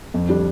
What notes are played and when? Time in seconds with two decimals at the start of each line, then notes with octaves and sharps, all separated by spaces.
0.14 F2
0.29 D3 G3 D4